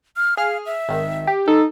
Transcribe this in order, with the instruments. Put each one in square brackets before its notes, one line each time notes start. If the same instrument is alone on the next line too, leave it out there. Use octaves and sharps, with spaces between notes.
[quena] F6
[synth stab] G#4 F6 [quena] F5
[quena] E5
[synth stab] G#1 D#3
G4
[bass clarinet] D#4 [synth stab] A4